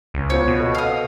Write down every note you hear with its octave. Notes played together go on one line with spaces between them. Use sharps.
C#2
B3 F4 C5 C#5
B2
A4 D#5
F5 D#6